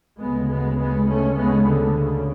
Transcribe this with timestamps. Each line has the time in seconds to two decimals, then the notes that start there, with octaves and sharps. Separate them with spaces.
0.21 D2 C#3 G#3 B3
0.50 G#3 B3
0.79 G#3 B3
1.08 A3 C#4
1.37 D2 C#3 G#3 B3
1.67 D3
1.96 C#3